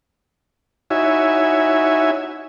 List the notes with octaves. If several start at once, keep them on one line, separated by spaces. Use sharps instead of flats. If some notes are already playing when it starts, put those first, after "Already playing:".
D#4 E4 F#4 C#5 E5 G#5